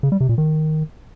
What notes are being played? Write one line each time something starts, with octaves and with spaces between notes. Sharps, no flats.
C#3
G3
C3
A#2
D#3